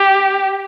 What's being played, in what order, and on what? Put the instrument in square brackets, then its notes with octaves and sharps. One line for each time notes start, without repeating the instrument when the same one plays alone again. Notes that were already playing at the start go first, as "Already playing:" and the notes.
Already playing: [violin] G4